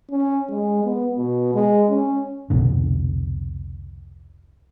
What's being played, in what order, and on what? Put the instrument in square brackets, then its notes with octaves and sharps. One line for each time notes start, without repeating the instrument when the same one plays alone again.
[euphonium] C#4
G#3
B3
B2
G#3
C#4
[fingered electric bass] C2 F2 B2 D3